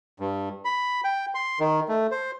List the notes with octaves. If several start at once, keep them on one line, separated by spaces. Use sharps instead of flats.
G2
B5
G5
C6
D#3
A3
C5